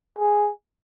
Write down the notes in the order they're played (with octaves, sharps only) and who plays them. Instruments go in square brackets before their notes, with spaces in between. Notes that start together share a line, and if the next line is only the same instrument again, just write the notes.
[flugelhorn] G#4